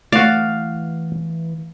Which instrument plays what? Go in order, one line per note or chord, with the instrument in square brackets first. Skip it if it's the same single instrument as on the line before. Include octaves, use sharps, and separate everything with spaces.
[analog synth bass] E3 [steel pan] A3 [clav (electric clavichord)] F#4 D5 [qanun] F5